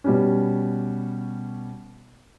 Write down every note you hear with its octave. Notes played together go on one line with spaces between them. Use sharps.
B2 G3 C#4